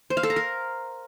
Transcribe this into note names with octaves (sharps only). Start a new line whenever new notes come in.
C5
F5
A4
A#5
A#4